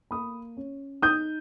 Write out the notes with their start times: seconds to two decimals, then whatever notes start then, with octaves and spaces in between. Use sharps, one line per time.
0.11 A#3 B5 D#6
0.57 C#4
1.02 D#4 D#6 G6